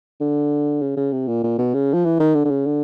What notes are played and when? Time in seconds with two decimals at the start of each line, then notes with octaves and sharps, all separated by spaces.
0.20 D3
0.81 C#3
0.97 C#3
1.12 C3
1.28 A#2
1.43 A#2
1.58 B2
1.74 C#3
1.93 F3
2.05 E3
2.20 D#3
2.34 D3
2.45 D3
2.50 C#3
2.66 D3